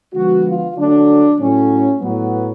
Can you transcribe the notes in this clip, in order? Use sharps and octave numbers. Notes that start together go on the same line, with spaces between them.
D3 F3 G#3 B3 F#4
F4
D3 F#3 A3 D4
A2 F#3 A3 C#4
A2 F#3 B3